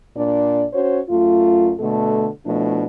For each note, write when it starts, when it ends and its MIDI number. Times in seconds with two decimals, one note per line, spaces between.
0.16 0.65 46
0.16 0.65 62
0.16 0.65 74
0.73 1.00 61
0.73 1.00 66
0.73 1.00 72
0.73 1.00 73
1.09 1.74 42
1.09 1.74 57
1.09 1.74 65
1.80 2.28 47
1.80 2.28 50
1.80 2.28 57
1.80 2.28 69
2.45 2.86 47
2.45 2.86 53
2.45 2.86 57
2.45 2.86 62
2.45 2.86 64